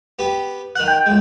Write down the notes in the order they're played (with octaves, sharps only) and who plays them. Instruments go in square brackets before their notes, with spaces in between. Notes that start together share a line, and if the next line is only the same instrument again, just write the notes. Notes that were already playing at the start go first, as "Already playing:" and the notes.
[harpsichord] B3 G4
[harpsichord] D#3 F#5 [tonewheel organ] F#6
[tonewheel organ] G5
[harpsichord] C#2 G#3